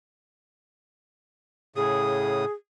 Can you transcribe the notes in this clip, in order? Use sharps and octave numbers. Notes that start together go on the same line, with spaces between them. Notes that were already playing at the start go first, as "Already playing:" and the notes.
A2 C#3 G#4 D#6